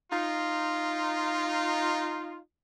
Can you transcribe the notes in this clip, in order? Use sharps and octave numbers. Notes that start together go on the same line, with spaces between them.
D#4 F4